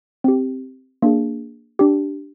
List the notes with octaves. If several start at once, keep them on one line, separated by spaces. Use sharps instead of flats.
C4 G4
A#3 D4 G#4
D4 G4